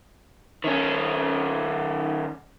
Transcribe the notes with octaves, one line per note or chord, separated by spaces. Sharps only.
D#3 C#4